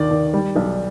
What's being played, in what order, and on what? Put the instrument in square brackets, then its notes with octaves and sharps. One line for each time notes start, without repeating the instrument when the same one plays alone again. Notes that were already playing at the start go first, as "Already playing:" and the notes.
Already playing: [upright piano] D#2 D#3 D5
D#3
G3
B1